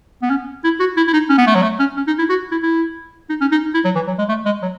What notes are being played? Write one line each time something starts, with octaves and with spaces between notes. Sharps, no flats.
B3
C#4
E4
F#4
E4
E4
D#4
C#4
B3
A3
F#3
A3
C#4
C#4
D#4
E4
F#4
E4
E4
D#4
C#4
D#4
E4
F#3
E3
F#3
G#3
A3
G#3
F#3